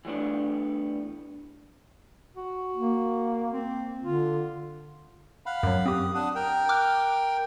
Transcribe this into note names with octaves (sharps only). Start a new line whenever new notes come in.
E3 G3 A3 B3 D4
F#4
A#3
C4
D3 F4
F5 F#5 B5
F#2 F#3
C4 G4 D#6
D4 F#5 D#6
A#4 G5
D6 F6 F#6